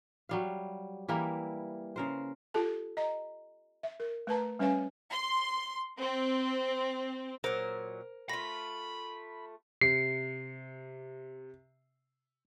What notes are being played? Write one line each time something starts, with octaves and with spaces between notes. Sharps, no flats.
F#3 G3 F5
E3 G3 A#3 E4
C#3 A#4 C5
F4 G4 A4 A5
D#5 A#5
E5
A#4
A3 B4 A5 A#5
G3 C#4 B4 C#5 F5 G#5
C6
C4
A#2 F#3 A#4 C5
A3 F4 B5 A#6
C3 C7 C#7